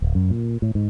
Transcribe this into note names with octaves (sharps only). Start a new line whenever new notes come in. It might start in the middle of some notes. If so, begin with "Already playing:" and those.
D1
F#2
A#2
A2
G#2